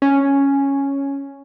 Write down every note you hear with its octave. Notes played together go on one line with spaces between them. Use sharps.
C#4